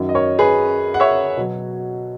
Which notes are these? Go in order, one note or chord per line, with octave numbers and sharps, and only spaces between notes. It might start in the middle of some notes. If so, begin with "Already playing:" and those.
Already playing: F#2 D#3 F#3
D#5
A#4 C#5
G#4 B4
F#5
C#5 E5
B2 F#3